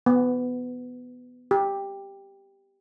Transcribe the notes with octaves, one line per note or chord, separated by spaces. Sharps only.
B3
G4